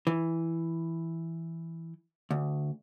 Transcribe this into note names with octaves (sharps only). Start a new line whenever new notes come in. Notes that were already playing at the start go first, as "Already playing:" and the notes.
E3
D2